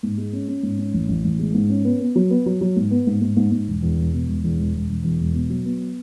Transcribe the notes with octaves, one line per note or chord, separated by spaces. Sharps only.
G#2
G#3
C#4
C#4
G#2
C#4
A1
A1
A1
G#3
G#2
C#4
B3
B3
F#3
B3
F#3
F#3
G#2
B3
G#2
G#2
G#2
G#2
E1
E2
E1
B2
E1
E2
E1
E1
E1
E2
E1
B2
F#3
B3